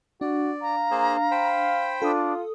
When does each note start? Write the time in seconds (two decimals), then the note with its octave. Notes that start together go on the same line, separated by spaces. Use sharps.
0.21 D4 F#4 D5
0.62 F5 A#5
0.91 A#3 G#4 C5
1.31 C5 G5 B5
2.02 D4 F4 A4 D#6